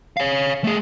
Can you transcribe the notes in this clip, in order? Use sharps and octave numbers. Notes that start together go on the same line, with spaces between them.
C#5 F5
A3 G#4